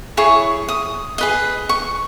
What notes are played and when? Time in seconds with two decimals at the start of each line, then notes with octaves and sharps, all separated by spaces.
0.17 E4 G#4 C#5 C#6
0.69 D#6
1.18 G#4 B4 D#5
1.69 C#6